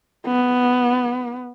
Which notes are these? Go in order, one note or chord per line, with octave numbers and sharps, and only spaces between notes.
B3